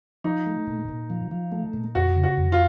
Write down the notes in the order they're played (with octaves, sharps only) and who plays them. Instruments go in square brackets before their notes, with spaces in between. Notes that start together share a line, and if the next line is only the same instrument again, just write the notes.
[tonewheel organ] F3 [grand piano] D#4
[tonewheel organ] A3
A#2
A#2
F3
F3
A3
A#2
[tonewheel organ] F2 [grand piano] F#4
[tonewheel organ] C#3
[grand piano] F#4
[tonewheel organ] F2
[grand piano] F4